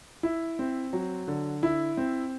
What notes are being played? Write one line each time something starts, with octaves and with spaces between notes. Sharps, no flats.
E4
C4
F#3
D3
E4
C4